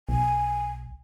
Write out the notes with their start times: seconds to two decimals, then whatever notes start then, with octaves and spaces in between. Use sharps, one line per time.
0.09 B1 G#5